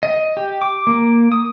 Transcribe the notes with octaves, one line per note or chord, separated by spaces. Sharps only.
D#5
G4
D6
A#3
D#6